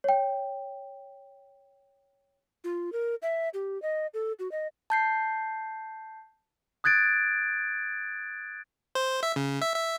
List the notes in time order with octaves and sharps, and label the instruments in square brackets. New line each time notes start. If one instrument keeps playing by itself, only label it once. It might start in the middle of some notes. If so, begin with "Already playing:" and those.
[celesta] C#5 G5
[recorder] F4
A#4
E5
G4
D#5
A4
F#4
D#5
[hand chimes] A5 G6 C7
[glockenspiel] D#6 F#6 G#6 A6 D7
[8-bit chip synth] C5
E5
C#3
E5
E5